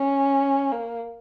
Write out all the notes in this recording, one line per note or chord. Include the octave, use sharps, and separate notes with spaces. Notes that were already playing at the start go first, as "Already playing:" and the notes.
Already playing: C#4
A#3